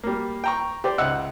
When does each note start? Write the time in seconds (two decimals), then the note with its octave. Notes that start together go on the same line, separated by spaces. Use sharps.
0.03 G3 A#3
0.44 G5 A#5 C#6
0.84 G4 C5 D5
0.98 C#2 D#4 E5 F#5 E6 F#6